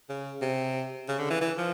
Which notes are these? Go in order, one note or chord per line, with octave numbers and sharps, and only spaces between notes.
C#3
C3
C#3
D3
E3
E3
F3